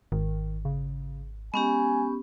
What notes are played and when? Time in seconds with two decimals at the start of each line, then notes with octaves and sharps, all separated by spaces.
0.12 G#1 D#3
0.65 C#3
1.54 G#3 B3 C#4 G4 G#5